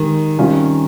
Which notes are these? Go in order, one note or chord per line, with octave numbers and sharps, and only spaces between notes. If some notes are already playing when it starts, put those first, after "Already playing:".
Already playing: D#3 G#3 D#4 G4
C3 G3 C#4 F4